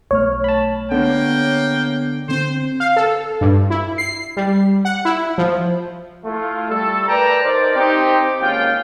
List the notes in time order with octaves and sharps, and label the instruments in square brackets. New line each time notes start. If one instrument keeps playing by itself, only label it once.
[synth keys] B1 A3 F6 [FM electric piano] C#5
[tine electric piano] A5 B5
[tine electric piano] D3 [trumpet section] A#3 G5 [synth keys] B3
[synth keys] D3 C4 [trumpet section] C5
[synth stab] F5
A4
G2
E4
C7
G3
F#5
E4
F3
[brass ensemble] A3 E4 F4
G3 A3 A4
A#4 B4 D5 G5 A5 A#5
D#4 A#4 C5 D5
C4 D#4 G4
G#1 A#3 C#4 F4 G5